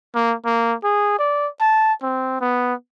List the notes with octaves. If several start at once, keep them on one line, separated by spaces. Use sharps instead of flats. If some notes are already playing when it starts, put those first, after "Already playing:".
A#3
A#3
G#4
D5
A5
C4
B3